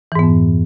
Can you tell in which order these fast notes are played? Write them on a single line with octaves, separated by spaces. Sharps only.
E3 G#2 B3 F2